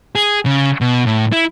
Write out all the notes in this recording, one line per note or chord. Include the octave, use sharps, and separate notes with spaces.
G#4
C#3
B2
A2
E4